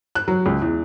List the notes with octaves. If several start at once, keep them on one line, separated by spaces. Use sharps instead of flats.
F#6
F#3
C#2
E2